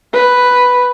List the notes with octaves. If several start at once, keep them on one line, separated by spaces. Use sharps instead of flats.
B4